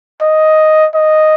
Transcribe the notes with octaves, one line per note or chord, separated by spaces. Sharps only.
D#5
D#5